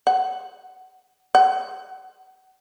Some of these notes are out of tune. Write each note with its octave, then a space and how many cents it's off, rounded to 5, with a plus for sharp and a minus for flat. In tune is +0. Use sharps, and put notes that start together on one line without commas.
F#5 +20
F#5 +30